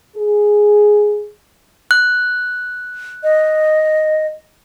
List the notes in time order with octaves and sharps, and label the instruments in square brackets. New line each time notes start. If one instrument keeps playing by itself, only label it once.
[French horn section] G#4
[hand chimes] F#6
[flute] D#5